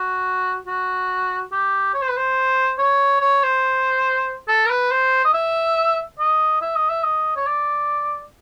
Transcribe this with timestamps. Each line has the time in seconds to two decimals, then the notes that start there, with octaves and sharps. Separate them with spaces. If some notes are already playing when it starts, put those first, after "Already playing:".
Already playing: F#4
0.66 F#4
1.52 G4
1.94 C#5
2.02 C5
2.09 B4
2.17 C5
2.78 C#5
3.21 C#5
3.43 C5
4.48 A4
4.66 A#4
4.70 B4
4.91 C5
5.25 D#5
5.33 E5
6.19 D#5
6.61 E5
6.76 D#5
6.90 E5
7.04 D#5
7.36 C#5
7.46 D5